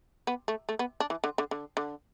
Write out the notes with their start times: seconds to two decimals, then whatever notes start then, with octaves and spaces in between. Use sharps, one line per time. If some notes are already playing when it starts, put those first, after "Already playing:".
0.27 B3
0.48 A3
0.69 A3
0.79 B3
1.00 D4
1.10 E3
1.24 D3
1.38 D3
1.51 D3
1.77 D3